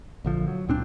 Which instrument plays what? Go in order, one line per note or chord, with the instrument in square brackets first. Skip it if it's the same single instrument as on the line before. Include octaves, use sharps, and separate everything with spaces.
[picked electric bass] A#1 D3 F3
F#3
C#2 A#2 C4 D4